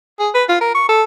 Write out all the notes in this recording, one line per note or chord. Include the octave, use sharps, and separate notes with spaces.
G#4
B4
F4
A#4
C#6
A4